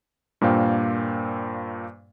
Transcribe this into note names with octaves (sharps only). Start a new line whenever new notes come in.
G2 A#2 A#3 C5 F5 G5